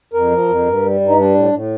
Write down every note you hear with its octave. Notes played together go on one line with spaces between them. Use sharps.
F2 A#4
F3
F2
G2
G3
G2
D#4
G3 D4
A2
A2